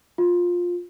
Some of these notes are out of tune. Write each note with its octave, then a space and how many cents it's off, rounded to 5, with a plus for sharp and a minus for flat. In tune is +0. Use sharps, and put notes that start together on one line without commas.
F4 +15